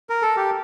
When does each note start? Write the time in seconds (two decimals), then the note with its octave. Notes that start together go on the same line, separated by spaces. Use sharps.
0.10 A#4
0.22 A4
0.37 G4